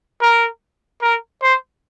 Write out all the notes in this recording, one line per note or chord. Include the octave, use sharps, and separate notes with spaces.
A#4
A#4
C5